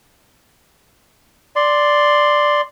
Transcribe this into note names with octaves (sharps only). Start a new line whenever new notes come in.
D5 C6